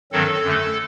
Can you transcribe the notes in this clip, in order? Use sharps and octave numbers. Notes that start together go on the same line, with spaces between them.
G2 D#3 F#3 C4 A4
F#2 D3 A3